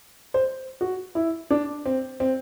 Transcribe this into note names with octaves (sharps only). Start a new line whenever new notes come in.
C5
F#4
E4
D4
C4
C4